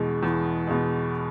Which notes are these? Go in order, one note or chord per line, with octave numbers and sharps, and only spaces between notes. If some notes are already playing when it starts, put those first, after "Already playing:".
Already playing: E2 B2 G#3
E2
B2 G#3